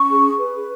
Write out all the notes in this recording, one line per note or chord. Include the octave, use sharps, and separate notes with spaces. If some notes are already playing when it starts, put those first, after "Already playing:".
Already playing: C#4 C#6
G#4
B4